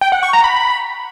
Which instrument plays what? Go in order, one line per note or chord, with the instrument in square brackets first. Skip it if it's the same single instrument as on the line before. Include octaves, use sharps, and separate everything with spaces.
[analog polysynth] G5
F#5
C#6
A#5
B5